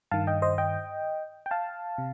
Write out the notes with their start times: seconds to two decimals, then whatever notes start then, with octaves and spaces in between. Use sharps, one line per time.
0.11 G2 D#3 F5 A5
0.27 D#5 G5
0.42 C5 D#5
0.58 D#5 G5
1.46 G5
1.51 F5 A5
1.98 C3